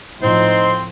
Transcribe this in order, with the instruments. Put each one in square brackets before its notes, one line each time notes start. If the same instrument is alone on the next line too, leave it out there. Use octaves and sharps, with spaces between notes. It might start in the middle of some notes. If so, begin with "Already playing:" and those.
[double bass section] A2 F3 [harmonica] C4 C6 [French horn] D#4 [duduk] C5